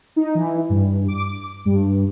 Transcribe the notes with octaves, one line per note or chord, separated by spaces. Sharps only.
D#4
E3
G2
D6
G2